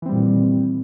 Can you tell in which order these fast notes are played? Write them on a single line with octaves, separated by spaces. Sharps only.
E3 C4 G3 A#2 D#3